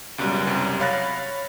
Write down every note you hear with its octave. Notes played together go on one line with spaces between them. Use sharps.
C#2 F#2 B2 G3
C2 F#2 C3
C#5 F5 B5 F#6 A6 A#6